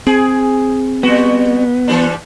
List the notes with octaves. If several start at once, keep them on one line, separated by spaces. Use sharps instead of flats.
C4 G#4
G3 B3 F#4
E3 G3 D4